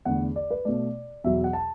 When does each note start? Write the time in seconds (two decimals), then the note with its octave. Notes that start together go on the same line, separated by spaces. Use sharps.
0.05 E2 D3 A3 F#5
0.36 D5
0.51 B4
0.65 B2 A3 D5
1.24 E2 B2 F#3 E5
1.44 F#5
1.53 A5